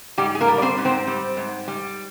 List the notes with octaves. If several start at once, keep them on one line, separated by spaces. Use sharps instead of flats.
G#2 G3 G4
G#4
A#3 A#4
G3
D5
C4 C5
G#2
C4 C5
G3
G#2
G3